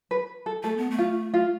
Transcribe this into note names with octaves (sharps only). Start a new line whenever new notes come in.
B4
A4
A3 A4
B3
A3
F4
F4